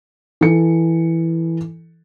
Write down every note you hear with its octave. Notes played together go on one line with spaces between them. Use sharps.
E3 A4 C#7